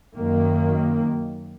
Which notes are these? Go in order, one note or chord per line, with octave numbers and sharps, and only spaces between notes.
F#2 D#3 A#3